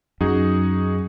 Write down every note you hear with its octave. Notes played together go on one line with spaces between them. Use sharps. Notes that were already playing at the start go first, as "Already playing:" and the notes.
F#2 D#4 F#4 G#4